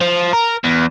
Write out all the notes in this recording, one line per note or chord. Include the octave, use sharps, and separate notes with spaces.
F3
A#4
E2